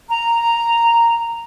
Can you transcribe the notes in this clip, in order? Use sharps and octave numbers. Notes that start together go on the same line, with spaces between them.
A#5